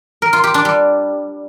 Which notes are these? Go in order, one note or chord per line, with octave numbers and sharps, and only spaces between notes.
A#4
F4
G4
D4
G3